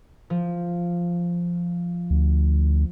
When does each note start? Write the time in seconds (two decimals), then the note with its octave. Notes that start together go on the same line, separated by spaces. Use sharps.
0.30 F3
2.10 D2